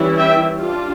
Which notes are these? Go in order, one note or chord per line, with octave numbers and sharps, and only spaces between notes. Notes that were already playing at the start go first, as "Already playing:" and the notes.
Already playing: E3 G3 C#4 E4
E5 G5
G3 D4 F4